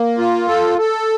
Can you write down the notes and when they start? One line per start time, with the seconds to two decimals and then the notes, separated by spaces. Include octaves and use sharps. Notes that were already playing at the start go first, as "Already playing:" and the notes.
Already playing: A#3
0.18 F4
0.48 A4
0.78 A4